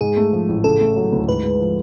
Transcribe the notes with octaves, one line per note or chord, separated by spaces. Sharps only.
G#2 G#4
A3
F3
A1
C#3 A4
A3
F#3
D2
G#2 B4
G#3
F3